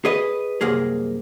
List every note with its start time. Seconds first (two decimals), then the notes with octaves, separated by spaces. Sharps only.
0.05 G#4 B4 D#5
0.61 C2 F#2 A#3 G#4